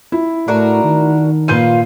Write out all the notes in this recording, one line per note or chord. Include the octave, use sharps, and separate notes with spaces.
E4
A2 D4 F#4 A#4
D#3
A#2 F4 B4 G6 D#7